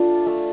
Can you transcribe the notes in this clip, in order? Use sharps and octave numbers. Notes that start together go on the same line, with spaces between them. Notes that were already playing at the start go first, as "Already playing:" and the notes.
Already playing: A3 D4 F4
A3